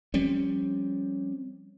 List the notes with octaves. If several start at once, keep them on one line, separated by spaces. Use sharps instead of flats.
F3 G3 C4 C#4